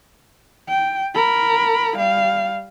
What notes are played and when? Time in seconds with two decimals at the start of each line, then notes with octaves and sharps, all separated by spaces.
0.68 G5
1.14 A#4 B5
1.97 G3 F5